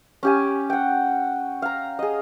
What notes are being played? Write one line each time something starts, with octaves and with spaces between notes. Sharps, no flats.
C#4 G4 G#5
F#5 G5
F5 A#5
G#4 D#5